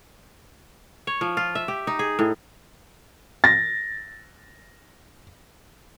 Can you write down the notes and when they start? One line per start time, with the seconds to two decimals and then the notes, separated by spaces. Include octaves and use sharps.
1.07 C#5
1.21 F3
1.37 F4
1.55 E5
1.68 G4
1.87 D#4
1.99 G#4
2.19 A2
3.44 A6 A#6